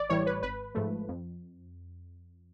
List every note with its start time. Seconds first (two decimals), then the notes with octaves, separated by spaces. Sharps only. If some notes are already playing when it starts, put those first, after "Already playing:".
Already playing: A1 D5
0.10 A2 E3 G3 C#5
0.27 B4
0.43 G#1 B4
0.75 G#2 F3 A3
1.08 F2